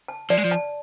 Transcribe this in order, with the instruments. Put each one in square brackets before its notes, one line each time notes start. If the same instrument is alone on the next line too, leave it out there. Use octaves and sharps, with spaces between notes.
[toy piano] A5
[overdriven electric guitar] F3 [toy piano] D5
[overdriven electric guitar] G#3
F3
[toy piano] A5